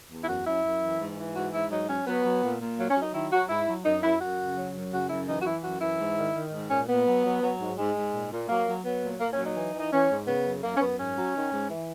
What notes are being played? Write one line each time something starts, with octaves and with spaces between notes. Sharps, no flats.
E2
E4
F#2 F#4
F#2 E4
F#2
E3
G#2
E3
G#2 F#4
G#2 E4
F#3 D#4
F#3 C#4
F#3 B3
F#3
A#2
A#2
F#3 A#3
C#4
F#3
D#4
D#3 E4
F#3 F#4
G#2 E4
F#3
F#2 D#4
F#2 E4
F#2 F#4
C#3
F#3
F#2
C#3 F#4
F#2 E4
E3 D#4
F#4
E3 E4
F#2 F#4
E3 E4
G#2
D#3
D#3
G#2
A#2 C#4
A#2 B3
F#3
F#3
F#3
G#2
G#2 G#3
G#2
A#2
A#2
F#3 A#3
F#3
F#3 B3
A#2
A#2 A#3
C#4
F#3
D#4
E3
E3
D#4
E3 C#4
G#2
C#3 B3
F#2
F#2 A#3
C#4
F#2 B3
G#2 C#4
F#3
D#3
G#2
E3